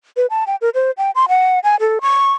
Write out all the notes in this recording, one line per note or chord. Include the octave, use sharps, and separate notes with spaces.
B4
A5
G5
A#4
C5
G5
C6
F#5
G#5
A4
C#6